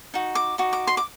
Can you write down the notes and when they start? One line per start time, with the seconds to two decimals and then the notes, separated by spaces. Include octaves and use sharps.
0.14 D#4 F#4
0.35 D6
0.58 D#4 F#4
0.73 D6
0.87 C6
0.97 D6